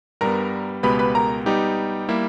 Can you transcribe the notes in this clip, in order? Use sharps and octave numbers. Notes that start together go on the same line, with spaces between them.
G2 G3 B3 A#4 A#5
C#2 B2 G#3 B3 G4 B4 B5
B4 B5
A#4 A#5
G3 B3 D#4 G4
G3 A#3 E4